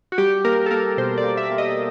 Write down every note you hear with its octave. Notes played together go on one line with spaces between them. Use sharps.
F#4
G3 G4
A#3 A#4
A4
A#3 A#4
B2 C5
D5
A#3
E5
A#3
D#5